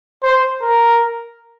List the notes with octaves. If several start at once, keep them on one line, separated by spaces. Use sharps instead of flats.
C5
A#4